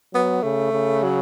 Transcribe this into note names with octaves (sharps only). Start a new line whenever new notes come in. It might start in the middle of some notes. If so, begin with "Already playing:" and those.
F#3 B3
C#3 A3
C#3
F#3